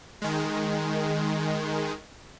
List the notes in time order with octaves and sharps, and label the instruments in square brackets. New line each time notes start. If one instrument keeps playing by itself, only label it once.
[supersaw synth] D#3 G#3